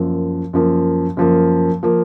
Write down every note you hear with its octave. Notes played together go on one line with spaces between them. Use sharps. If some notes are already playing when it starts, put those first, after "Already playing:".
Already playing: F#2 F3 A#3
F#2 F3 A#3
F#2 F3 A#3
F3 A#3